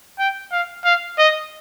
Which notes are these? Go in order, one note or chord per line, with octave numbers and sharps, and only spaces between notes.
G5
F5
F5
D#5